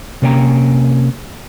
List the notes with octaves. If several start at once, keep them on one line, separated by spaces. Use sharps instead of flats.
C3 A#3 C#4 D5 G5 A#5